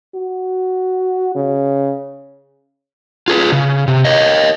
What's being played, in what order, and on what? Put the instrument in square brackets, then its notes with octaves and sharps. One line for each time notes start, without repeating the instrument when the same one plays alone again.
[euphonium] F#4
C#3
[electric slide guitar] F4 G#4 B4
C#3
C3
A#4 C#5 D#5